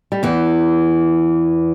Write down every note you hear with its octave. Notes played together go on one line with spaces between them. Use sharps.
G3
E2 E3